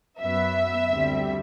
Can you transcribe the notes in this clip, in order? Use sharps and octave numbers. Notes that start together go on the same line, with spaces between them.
F#2 F#3 B3 E5
D2 D3 G3 C4